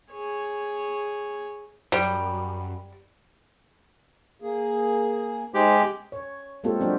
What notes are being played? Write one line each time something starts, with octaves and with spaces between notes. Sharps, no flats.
G#4 C#5
F#2 G3
A#3 G#4
G#3 D#4 G4 C5
C#5
G#3 A#3 C4 F4 G4 A4
F#3 C4 D4 F#4 G4